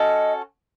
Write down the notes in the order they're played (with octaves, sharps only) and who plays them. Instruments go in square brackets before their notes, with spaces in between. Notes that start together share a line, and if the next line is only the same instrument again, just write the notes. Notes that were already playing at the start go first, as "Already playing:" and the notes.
Already playing: [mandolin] C#4 F#4 A4 [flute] D#5